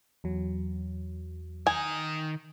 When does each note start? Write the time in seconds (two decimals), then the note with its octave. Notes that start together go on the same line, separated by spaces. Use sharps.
0.24 E2 F#3
1.67 D#3 G#5